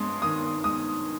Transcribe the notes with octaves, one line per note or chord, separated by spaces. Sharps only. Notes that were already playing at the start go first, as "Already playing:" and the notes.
Already playing: G2 G#3 C6 D#6
D#3 D#6
G#3 D#6